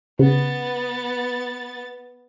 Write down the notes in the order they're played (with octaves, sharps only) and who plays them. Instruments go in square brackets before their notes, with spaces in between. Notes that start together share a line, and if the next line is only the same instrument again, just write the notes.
[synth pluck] C#3 [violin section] B3 A6